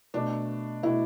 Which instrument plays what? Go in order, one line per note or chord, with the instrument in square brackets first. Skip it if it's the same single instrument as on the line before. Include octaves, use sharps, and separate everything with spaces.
[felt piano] B2 A3 D4
B2 A3 E4